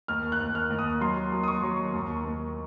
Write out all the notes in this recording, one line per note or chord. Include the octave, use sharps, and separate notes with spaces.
D#2 F6
F#6
D#2
F6
D#2
D#6
F#3 C6
F#3
D#6
C#6
F#3
D#2
D#2